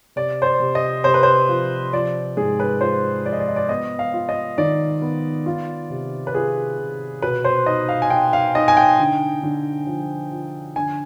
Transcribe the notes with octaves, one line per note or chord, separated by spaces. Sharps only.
C3 D5
C5
D5
C3
D#5
C3 C5
B4
C5
F3
F3 D5
G#2 G#4
B4
F4 C5
F3 D5
D#5
D5
D#5
D5
B3 D#5
F5
F4
D#5
D#3 D5
B3
F4
C3
B4
F4 G#4
C3
B2 B4
C5
D#4 D#5
F5
G#5
D#4 G5
F5
D#4 D#5
G#5
G5
D3
D3
F3
F3
D3 G#5